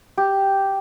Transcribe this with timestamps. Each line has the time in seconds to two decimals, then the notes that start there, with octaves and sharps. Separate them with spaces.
0.17 G4